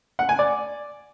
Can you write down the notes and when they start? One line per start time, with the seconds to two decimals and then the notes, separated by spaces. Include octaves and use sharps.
0.19 F#5
0.29 G#5
0.39 D5